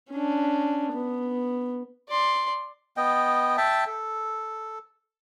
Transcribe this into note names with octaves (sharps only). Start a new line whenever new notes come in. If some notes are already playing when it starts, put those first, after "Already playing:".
C#4 D4
B3
D5 C6
B3 D#5 G5
E5 G5 A5
A4